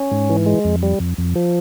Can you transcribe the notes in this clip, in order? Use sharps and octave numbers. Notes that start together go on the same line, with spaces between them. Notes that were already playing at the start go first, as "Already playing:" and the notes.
Already playing: C#4
G#2
E3
G#3
F2
G3
F2
F2
F3